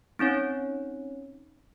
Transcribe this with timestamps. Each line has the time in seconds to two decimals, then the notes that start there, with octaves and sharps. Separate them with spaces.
0.19 C4 C#4 D#4 C#5